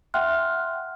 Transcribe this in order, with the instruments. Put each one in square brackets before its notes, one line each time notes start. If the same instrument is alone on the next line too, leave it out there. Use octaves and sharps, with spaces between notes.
[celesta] E5 F#5 G5 C6 F6 F#6